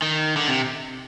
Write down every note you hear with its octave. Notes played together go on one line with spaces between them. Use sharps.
D#3
D3
C3